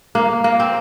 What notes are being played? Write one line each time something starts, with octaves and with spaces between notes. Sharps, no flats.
A#3
A#3
C4